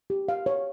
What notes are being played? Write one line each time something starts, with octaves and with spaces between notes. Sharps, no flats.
G4
F5
C#5